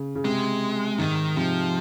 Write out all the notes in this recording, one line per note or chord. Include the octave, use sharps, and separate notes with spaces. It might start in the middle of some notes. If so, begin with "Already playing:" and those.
Already playing: C#3
C#3
C3 G#3
G#2 D#3
C3 F3